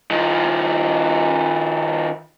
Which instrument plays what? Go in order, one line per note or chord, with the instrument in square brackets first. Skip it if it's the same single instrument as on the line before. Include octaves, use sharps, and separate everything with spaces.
[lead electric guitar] D#3 F3